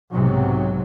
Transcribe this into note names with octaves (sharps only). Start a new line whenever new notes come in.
B1 G#2 C3 F#3